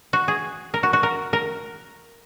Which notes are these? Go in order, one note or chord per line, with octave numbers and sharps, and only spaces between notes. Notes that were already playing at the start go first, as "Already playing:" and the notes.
F#4
G#4
A#4
F#4
F#4
A#4
A#4